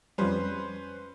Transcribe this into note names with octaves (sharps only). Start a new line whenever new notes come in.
F2 F3 G3 C#4 B4 C5